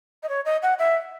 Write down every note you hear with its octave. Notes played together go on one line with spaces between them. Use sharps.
D#5
C#5
D#5
F#5
E5